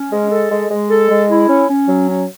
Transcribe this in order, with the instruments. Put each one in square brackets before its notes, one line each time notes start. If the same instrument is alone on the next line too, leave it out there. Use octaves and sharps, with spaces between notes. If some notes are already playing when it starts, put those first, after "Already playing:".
Already playing: [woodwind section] C#4
G#3
A4
G#3
G#3
A4
G#3
E4
C#4
C#4
F#3
C#4